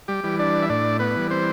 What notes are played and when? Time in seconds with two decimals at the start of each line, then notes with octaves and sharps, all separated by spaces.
0.08 G3 G4
0.24 E3 G3
0.39 D4 D5
0.62 E5
0.69 A2 D4 D5
1.00 B3 B4
1.16 E3 G3
1.31 C4 C5